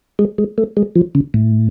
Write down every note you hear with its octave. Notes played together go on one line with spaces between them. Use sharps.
G#3
G#3
A3
G#3
F3
C#3
A2